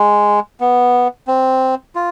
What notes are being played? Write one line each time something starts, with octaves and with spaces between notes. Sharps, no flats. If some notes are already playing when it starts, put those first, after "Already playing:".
Already playing: G#3
B3
C4
F4